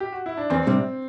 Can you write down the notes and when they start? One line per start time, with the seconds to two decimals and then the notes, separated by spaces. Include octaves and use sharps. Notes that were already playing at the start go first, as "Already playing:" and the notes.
0.00 G4
0.12 F#4
0.26 E4
0.37 D4
0.50 E2 C4
0.67 C3 G3 D4